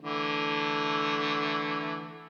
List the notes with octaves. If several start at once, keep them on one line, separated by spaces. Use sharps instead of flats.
D3 E3 A3